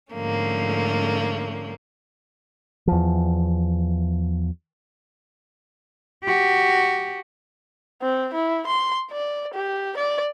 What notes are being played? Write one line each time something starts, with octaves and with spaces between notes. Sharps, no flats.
G#2 D3 F3 A3 A#3 C#4
E2 F3
F#4 G4
C4
E4
C6
D5
G4
D5